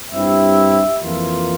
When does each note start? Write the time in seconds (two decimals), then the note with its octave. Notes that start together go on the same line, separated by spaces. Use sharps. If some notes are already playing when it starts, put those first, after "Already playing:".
0.12 G2 G3 C4 E4 E5
0.99 F2 E3 A#3 F4